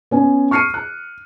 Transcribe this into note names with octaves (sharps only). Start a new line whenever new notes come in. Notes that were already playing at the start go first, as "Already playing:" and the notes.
B3 C#4 G#5
C#6 F6 C7 C#7 D#7
F#6